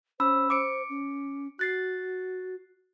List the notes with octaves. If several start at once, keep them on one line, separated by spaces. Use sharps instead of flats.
C#4 C5 B5 E6
C5 D6 C#7 D7
C#4
F#4 F#6 A6 C7